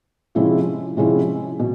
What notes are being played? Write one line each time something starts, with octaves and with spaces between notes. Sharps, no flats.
C3 F3 G#3 C#4 E4
C3 F3 G#3 C#4 E4
B2